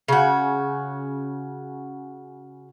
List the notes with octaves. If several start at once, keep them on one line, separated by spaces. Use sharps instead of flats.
C#3 F#4